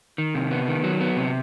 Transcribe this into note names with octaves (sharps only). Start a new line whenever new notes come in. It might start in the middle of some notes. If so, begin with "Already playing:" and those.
D#3
C3
B3
D#3
F#3
B3
C3